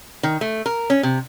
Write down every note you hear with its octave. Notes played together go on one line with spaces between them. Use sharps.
D#3
A3
A#4
C#4
C3